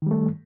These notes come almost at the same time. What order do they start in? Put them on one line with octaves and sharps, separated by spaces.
D#3 G3 A3